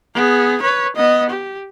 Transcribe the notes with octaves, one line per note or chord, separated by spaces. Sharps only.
B3 G#4
B4 C#5
B3 D#5
G4